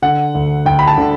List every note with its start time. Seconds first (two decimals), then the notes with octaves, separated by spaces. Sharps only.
0.02 D3 F#5
0.35 D2
0.66 D2 G5
0.79 B5
0.88 A5
0.98 D3